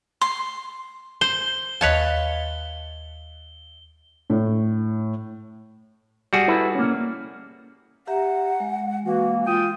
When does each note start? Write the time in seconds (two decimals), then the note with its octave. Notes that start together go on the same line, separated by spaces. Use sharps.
0.21 C6
1.21 C5 G7
1.81 D#2 B4 C#5 D#5 F5 A5
4.30 A2
6.33 G3 F#4 G#4
6.48 E4 A4 B4
6.75 A#3 C#4
8.07 G4 E5 F#5 A#5
8.60 G#3
9.05 E3 A#3 F#4
9.46 F4 G5 D#6